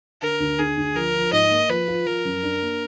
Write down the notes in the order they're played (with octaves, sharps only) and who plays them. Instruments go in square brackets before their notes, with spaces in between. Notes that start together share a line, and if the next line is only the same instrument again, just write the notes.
[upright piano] D3 [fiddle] A#4
[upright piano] D2
[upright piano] D2 [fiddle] G#4
[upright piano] D2
[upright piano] F3 [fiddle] A#4
[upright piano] F3
[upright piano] G#2 [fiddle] D#5
[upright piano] A#3
[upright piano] F3 [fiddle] B4
[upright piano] F4
[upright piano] F3 [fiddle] A#4
[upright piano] F#2
D4
A#3